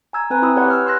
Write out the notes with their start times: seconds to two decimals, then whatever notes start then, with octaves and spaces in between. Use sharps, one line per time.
0.13 G#5 A#5 E6 G#6
0.30 C4 B4 G#5 A#5
0.42 E4 G5 D#6 E6
0.56 G4 B4 C#5 D5 F#5 G#5
0.70 E6 F6
0.86 C6 E6 F#6 A#6